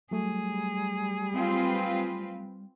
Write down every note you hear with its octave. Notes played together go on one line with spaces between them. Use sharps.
F#3 G3 A3 G#4
C4 F4 B4